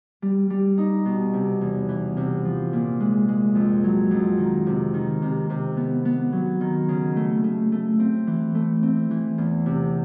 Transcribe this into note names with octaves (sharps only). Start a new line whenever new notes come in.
G3
G3
D#4
B2
C3
E2
E3
C3
F3
A#2
G#3
G#3
F2
F#3
F2
D#3
C3
D#3
C3
C3
B3
B3
F#3
D#3
C#3
A3
A3
A3
C4
E3
A3
C4
E3
E2
C3